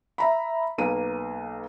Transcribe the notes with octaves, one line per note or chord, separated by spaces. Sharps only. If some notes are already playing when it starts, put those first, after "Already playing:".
E5 A#5 B5
B1 A#3 B4 D#7